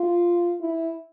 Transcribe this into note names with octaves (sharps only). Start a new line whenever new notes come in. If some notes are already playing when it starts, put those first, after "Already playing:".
Already playing: F4
E4